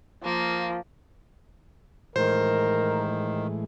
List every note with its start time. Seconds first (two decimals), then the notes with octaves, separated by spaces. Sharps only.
0.24 F3 A#3
2.16 A2 D#3 E3 G#3 A#4 C5